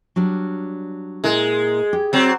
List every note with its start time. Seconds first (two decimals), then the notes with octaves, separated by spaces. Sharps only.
0.16 F#3 G3 D4
1.24 A#2 G#3 E4 A#4
1.93 G4
2.13 F#3 C4